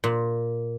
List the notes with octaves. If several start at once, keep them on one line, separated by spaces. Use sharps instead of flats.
A#2